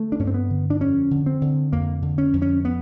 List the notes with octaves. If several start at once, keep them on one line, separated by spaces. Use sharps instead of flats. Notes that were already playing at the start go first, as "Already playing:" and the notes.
Already playing: D3 A3
D4
G2 C#4
C4
B3
D3
D4
F2 C#4
D3
C4
D3
F2 A#3
D3
C#4
F2
C#4
B3